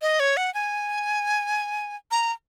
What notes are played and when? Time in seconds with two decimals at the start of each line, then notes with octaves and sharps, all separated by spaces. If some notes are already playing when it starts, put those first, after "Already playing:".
0.02 D#5
0.20 C#5
0.37 F#5
0.54 G#5
2.11 A#5